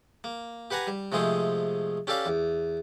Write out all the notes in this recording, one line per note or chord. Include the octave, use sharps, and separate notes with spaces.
A#3
G4 B4 F#5 G#5 A#5
G3
C3 F3 G#3 A3 G#4 C5
C#4 G4 A4 D5 F5
E2